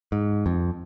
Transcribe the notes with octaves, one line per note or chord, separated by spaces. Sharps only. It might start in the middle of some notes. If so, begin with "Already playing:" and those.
G#2
F2